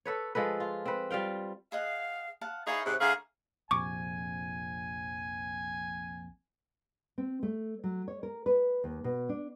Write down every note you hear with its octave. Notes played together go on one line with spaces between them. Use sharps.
A4 B4 C#5
F3 G#3 A4 B4
F4
C4 B4
G3 F4 F5 G5
G#4 D#5 F5 F#5
F5 F#5 A5
D#4 E4 G#4 A#4 C#5 F5
G#2 C3 F#6
D3 A3 G#4 F5 A#5
A#1 F2 C3 G#5 C#6 D6
C4
A3
F#3
C#5
A#4
B4
D#2
B2
D4